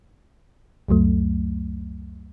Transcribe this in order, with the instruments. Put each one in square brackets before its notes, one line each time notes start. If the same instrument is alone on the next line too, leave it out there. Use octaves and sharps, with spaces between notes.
[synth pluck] C#2 F#2 F#3 A3